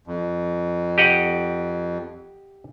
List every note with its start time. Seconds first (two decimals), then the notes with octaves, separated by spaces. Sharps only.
0.07 F2
0.98 G4 D#5 F#5